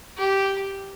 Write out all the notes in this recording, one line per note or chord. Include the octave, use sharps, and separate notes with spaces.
G4